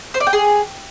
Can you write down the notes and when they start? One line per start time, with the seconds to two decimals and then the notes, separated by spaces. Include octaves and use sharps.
0.14 C5
0.20 D5
0.27 G5
0.33 G#4